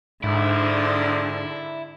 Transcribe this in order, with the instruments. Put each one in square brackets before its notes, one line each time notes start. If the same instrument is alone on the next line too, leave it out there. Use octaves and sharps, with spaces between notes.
[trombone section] A#1 [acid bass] G#2 [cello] D3 D4 [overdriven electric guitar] E4